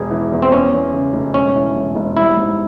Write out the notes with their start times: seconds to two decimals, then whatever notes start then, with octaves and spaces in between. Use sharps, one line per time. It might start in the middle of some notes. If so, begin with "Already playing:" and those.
Already playing: E1 E2 G#4
0.11 E3
0.32 E2
0.42 C4
0.52 E2 C#4
0.73 E2
0.94 C#3
1.13 F1
1.34 E1 C#4
1.55 E3
1.76 E1
1.95 E1
2.16 G3 E4
2.37 G#2